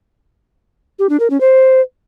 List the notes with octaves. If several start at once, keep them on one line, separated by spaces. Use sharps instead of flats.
G4
D4
A#4
C#4
C5